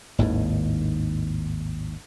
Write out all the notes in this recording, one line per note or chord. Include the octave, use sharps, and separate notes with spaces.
G#1 D#2 A2